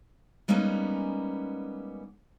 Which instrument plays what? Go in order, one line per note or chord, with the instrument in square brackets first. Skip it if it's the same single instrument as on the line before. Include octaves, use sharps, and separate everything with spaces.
[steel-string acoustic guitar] G3 G#3 A#3 B3 C#4 D#4